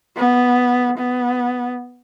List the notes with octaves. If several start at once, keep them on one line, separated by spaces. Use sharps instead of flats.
B3
B3